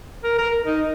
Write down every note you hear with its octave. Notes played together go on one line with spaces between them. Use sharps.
A#4
A#4
D#4